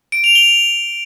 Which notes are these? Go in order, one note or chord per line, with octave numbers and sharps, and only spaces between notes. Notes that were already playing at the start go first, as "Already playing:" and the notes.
D7
F7
G7